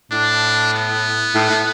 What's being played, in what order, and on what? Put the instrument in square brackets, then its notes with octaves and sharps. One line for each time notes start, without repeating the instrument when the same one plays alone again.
[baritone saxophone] A2 [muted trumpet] D4
[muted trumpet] B3
[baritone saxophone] A2
A2